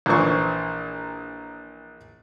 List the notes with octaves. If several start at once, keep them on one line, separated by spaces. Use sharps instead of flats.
A#1 A#2 E3 C5 C#6